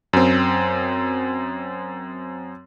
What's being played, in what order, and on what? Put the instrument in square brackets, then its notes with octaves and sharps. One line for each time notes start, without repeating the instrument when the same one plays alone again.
[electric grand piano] F#2 C4